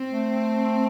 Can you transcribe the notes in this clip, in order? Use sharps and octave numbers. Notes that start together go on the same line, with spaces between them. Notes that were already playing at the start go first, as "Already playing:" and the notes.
Already playing: C4
A3